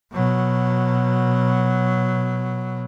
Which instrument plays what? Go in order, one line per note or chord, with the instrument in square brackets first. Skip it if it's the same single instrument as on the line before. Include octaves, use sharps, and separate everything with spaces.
[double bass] B2 F#3